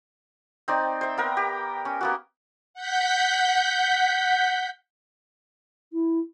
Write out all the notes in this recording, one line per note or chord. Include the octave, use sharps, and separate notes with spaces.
C4 D#4 D5
C5 E5
B3 A#4 G5
G4
C#4
A#3 B3 F#4
F#5 G6 B6
E4